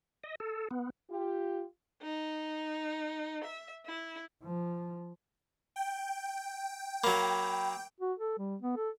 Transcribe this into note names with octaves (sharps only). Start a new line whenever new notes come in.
D#5
A4
B3
F4 G4
D#4
E5
E4
F3
G5
F#3 A#3 B5 D6
F#4
A4
G3
B3
A4